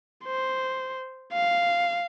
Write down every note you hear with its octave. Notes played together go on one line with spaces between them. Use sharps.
C5
F5